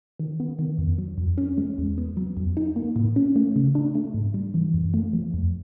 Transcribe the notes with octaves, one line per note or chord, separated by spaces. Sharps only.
D#3
B3
D#3
F2
F#3
F2
C#4
G#3
E2
B3
F#3
F2
D#4
A#3
A2
C#4
A3
C#3
D4
A3
G#2
G3
E3
F#2
A3
F3
F2